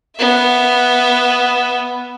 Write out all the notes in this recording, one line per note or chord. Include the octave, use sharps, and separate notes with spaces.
B3 E5